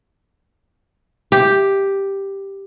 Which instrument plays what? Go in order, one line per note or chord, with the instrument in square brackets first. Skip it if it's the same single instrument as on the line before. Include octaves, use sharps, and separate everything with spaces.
[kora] G4